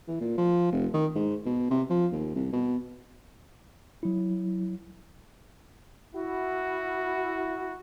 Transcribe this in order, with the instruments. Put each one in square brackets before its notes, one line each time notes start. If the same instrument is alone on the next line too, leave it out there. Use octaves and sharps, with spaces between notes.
[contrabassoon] E3
A#2
F3
F1
D#3
G#2
B2
C3
F3
D#2
C2
B2
[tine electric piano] F#3 E4
[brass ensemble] E4 F#4